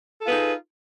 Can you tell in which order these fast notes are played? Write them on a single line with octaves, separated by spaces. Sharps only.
A4 F4 B4 G#4 D#4